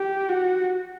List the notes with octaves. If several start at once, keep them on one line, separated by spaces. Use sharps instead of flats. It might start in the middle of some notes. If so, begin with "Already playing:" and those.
Already playing: G4
F#4